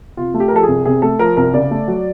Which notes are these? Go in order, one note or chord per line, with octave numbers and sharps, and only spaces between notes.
C3 F4
A3
G4
A#4
F3 A4
C2 G#4
C3 G#4
A3 A4
F3 A#4
C2 A#4
C#3 D5
A3
F#3